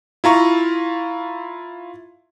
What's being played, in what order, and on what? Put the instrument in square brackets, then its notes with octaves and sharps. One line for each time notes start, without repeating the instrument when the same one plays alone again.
[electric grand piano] E4 F4 A#5 C#6